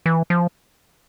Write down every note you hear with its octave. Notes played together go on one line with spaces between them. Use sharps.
E3
F3